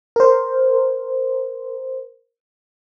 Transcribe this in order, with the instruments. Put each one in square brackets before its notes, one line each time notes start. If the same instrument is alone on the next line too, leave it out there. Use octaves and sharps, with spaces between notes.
[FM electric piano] A#4 C5